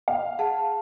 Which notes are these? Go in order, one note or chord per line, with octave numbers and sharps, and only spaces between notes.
F5
G#4 F#5 A5